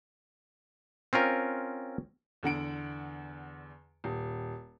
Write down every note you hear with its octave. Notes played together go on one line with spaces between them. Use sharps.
C4 C#4 F4 A#4
E2 D3 F#5 D7
D#1